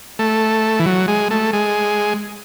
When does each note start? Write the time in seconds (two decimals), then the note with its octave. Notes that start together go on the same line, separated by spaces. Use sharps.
0.19 A3
0.79 E3
0.86 F#3
1.08 G#3
1.31 A3
1.53 G#3